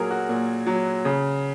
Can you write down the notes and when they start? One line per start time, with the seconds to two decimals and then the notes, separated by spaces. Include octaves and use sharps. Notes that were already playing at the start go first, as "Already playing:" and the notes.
Already playing: A#2 F#3 G#4 A#4
0.11 F#4
0.29 A#2
0.67 F#3
1.05 C#3